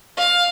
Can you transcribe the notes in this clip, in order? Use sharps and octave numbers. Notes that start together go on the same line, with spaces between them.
F5